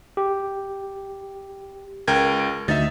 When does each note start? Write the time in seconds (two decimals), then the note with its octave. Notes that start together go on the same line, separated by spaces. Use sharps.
0.17 G4
2.08 C#2 A#4 G5 G#6
2.68 D2 D#4 E5 A6